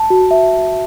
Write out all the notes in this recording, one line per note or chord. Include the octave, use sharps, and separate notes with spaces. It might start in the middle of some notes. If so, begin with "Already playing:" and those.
Already playing: A5
F#4
E5